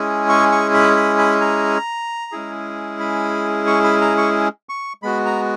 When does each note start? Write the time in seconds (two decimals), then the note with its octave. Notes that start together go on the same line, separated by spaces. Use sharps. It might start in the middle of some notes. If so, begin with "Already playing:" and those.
Already playing: G#3 C#4 E4 G#4
0.29 C#6
0.52 C#6
0.74 B5
0.96 B5
1.19 B5
1.41 A#5
2.32 G#3 C#4 E4 G#4
3.00 B5
3.67 C#6
3.84 B5
4.01 A#5
4.18 C#6
4.69 C#6
5.03 G#3 B3 F#4 B5
5.25 A#5